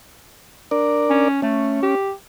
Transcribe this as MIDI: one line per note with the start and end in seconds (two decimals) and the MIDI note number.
0.71 1.28 62
0.71 1.28 70
0.71 1.28 74
1.10 1.41 61
1.42 1.81 57
1.42 1.95 61
1.82 2.12 67